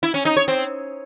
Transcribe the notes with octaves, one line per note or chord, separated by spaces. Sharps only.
E4
C#4
D#4
C#5
C4